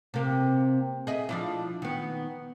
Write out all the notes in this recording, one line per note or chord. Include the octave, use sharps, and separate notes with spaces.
C3 A#3
G#4 D#5 E5
F3 D4 E4
D#3 B3